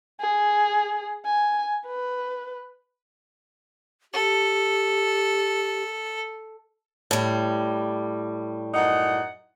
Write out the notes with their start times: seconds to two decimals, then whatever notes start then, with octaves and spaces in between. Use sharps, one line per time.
0.21 G#4
1.26 G#5
1.87 B4
4.13 G4 A4
7.11 A2 G3
8.74 F#2 D#4 F#5